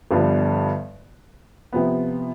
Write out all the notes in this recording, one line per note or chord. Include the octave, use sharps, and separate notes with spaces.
G1 G2 F3 B3 D4
C3 F3 B3